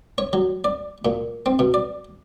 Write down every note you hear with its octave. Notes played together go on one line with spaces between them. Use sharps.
C#5
F#3
D5
A#2
C4
B2
D5